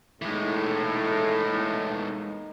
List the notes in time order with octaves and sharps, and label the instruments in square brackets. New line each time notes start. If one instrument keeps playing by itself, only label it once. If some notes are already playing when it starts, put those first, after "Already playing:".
[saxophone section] A2 [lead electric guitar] E3 G#3 [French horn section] A#3 B3 D#4